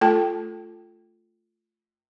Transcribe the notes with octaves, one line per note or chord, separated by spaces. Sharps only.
A3 F4 A4 G5 A5